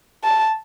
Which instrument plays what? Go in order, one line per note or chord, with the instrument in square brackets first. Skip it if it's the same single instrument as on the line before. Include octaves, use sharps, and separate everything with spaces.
[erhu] A5